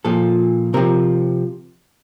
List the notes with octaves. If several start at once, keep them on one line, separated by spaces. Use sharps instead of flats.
A#2 F3 A4
C3 F3 A#4